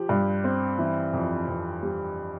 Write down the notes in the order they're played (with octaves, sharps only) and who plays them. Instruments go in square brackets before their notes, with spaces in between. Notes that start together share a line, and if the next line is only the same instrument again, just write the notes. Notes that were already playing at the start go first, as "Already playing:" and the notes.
Already playing: [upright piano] F3 G4
G2
C4
E3
F2
F2
G3